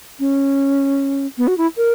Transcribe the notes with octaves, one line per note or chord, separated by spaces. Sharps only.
C#4
B3
F#4
E4
A#4